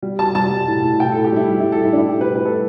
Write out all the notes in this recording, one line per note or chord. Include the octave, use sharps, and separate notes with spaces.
G3
G3 A5
G3 A5
G3
A2
A2
A2 G5
A4
A2
G4
G3 E4
G3
E4
G3
A4
A2 E4
D4
G3 E4
G4
A2
B4
A2
B4
G3 A4